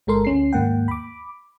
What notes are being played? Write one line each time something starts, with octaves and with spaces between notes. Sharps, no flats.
G1 G#3 A4 A#4 C6
D2 C#4 C7
D#2 G#2 A#3 F#5 G5
B5 D6